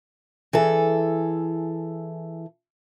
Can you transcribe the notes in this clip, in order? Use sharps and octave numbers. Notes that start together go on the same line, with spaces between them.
E3 G#4 A4